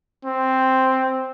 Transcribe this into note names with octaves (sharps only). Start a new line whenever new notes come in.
C4